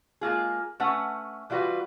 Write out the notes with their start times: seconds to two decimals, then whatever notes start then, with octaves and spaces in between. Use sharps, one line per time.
0.21 G#3 A#3 F4 G#4
0.80 A3 C#4 B4 F#5
1.50 E3 G3 F4 F#4 B4